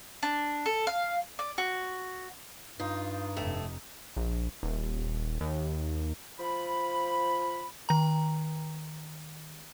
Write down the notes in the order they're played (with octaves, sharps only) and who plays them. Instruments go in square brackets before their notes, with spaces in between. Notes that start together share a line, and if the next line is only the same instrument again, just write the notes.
[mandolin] D4
A4
F5
D5
F#4
[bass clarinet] G2 [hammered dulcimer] D#4 [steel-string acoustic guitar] F4
[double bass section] F1 [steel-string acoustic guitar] A2 A3
[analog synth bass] A#1
D#1
D#2
[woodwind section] F3 B5
[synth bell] D#3 A#5